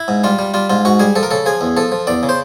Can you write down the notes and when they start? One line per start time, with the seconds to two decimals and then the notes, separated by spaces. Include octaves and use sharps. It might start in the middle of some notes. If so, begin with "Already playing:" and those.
Already playing: E4
0.08 G#2
0.24 G3 F4
0.39 G3
0.54 G3 F4
0.70 G#2 F4
0.85 G#2 F#4
1.00 G3 G#4
1.16 F3 A4
1.23 A#4
1.31 C#3 A4
1.46 F3 G#4
1.61 E2
1.77 F3 A4
1.92 F3
2.07 E2 D5
2.23 C#3
2.29 C5